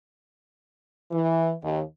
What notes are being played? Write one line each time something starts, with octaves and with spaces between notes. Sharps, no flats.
E3
D#2